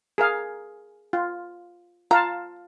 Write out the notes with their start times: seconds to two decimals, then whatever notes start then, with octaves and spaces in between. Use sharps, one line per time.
0.18 G#4 A#4 F5
1.13 F4
2.11 F4 F5 A5 A#5